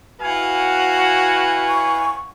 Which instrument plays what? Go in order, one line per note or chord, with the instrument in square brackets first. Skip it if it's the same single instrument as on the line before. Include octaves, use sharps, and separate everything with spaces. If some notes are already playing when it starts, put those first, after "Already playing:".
[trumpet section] E4 B4 G#5 [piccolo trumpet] F#4 [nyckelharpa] F5 F#5
[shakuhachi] C#6